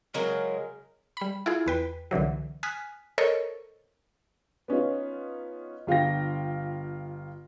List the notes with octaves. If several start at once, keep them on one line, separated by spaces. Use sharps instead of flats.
C#3 F#3 G#3 A#4
G3 B5
E4 F4 G#4
E2 B4 G5
C2 D3 E3 F#3
G#5 D#6 F6 F#6 B6
A4 A#4 C5 C#5 D#5 C#6
B3 C#4 D#4 F4
G1 F4 F5 G5 A#6